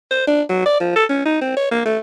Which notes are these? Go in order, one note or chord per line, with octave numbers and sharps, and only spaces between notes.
C5
D4
F#3
D5
F3
A4
C#4
D#4
C4
C#5
A#3
A3